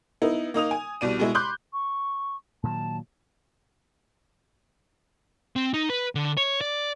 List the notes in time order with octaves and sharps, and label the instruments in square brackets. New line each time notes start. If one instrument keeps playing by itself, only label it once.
[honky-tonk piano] B3 D#4 E4
A#3 D#4 D#6 F7
G#5
C2 B2 D5 D#7
B2 G#3 E4
B5 C6 D6 F#6 G6
[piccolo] C#6
[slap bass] A#2 D#3 F#3 [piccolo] A5
[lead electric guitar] C4
D#4
B4
D3
C#5
D5